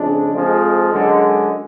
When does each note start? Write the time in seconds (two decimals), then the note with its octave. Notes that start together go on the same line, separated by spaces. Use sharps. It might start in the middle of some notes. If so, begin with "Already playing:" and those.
Already playing: F2 C#3 G#3 D4
0.33 F2 F3 G#3
0.93 F#2 D3 G#3